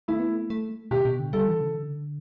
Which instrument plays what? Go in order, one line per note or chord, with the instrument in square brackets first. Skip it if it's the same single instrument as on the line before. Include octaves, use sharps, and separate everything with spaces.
[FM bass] A3 [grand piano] E4
[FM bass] B3
A3
A3
[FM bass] B2 [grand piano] G4
[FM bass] B2
D3
[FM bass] G3 [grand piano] A4
[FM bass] E3
C#3
D3